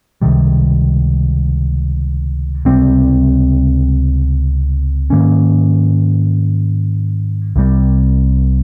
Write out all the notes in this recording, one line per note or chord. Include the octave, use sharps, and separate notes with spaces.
C#2 C3 D#3 G3
C#2 C3 G3 C4
G#2 D#3 A#3 C#4
C2 C3 G3